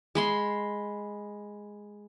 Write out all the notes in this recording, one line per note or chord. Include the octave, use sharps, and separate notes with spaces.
G#3 B5 C6